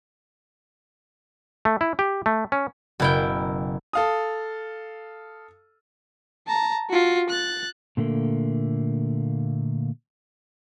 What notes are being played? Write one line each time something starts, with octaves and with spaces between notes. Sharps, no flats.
A3
E4
G4
A3
C#4
F#1 B2 E4 F5 G5 A#5
A4 F5 D#6
A5 A#5
F4 F#4
F#6 A6
A#2 D3 A3 A#3